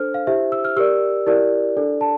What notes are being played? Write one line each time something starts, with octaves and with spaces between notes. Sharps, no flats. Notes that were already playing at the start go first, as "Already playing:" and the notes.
Already playing: D4 A4 C5 F6
F5
E4 G4 C5 E5
E6
F6
G4 A#4 D5 E6
E4 G4 A#4 D5
D4 A4 D5
A5